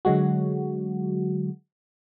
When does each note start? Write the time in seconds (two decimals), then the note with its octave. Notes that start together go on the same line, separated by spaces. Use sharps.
0.05 D3 F#3 G#3 F#4